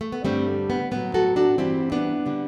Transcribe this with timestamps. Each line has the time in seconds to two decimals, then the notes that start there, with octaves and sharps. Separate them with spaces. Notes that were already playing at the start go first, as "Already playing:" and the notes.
0.01 A3
0.12 B3
0.24 G2 D3 G3 A3 C4
0.70 B3
0.91 A2 F#3 B3
1.14 F#4 A4
1.36 D4 F#4
1.58 G2 E3 G3 C4 E4
1.92 B3 D4
2.26 D3 G3